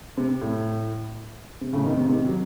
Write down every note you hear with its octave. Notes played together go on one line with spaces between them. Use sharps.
C3
A2
C3
A2 C#3
C3 D#3
C3
C3 D#3
F#3